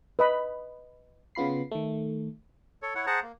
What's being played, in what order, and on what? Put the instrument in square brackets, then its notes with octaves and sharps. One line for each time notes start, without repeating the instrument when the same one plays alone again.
[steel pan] B4 D#5 B5
[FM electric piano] C#3 B3 F4 B5 C7
D#3 A3
[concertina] A4 C#5
E4 C#5 F#5
G#4 C5 F#5 A5 A#5
A#3